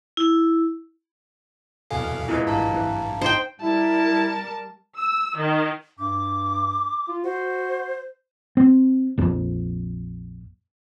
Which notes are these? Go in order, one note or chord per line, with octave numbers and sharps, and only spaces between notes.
E4
E2 B2 A4 F5 G#5
A#2 G#3 B3 E4
A1 G2 F5 A5 A#5
E3
D#4 C5 G5
G3 E4 A#4 A5
E6
D#3
G2 D6
F4
F#4 C5
C4
A#1 F2